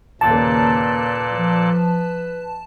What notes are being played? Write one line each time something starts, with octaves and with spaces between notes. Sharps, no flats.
D#2 A#2 C#3 A#3 A4 B4 D5 A5
F3